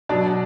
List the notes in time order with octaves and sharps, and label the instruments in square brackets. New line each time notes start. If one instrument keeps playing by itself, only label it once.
[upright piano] B2 F#3 D4 D5